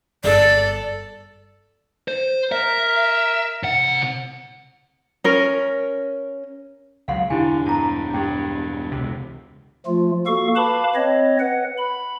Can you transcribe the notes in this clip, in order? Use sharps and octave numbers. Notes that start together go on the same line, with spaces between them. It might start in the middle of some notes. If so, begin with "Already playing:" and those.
G1 A4 D5
C5
A#4 E5
C3 F#5
C#4 A#4
C#2 F#3 F5 F#5 C6
E1 D3 D4 E4 G4 G#5
G2 A5 A#5
G2 G4 G5
C#2 C3
F3 A3 F4
A#3 F#4 A4 F5 C#6
B4 F5 A5 B5 D6
C4 C#5 D#5
B4 F#5
B5